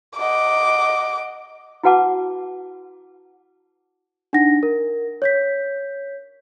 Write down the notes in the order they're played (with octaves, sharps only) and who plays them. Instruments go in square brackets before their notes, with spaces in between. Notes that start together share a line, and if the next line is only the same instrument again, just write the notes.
[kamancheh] D#5 F#5 [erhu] D6
[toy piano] E4 F#4 B4 F#5 A5 D6
[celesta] D4 D#4 F#5 A#6
A#4
C#5 G6 B6